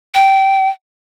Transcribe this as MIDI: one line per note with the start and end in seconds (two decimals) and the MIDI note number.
0.15 0.69 79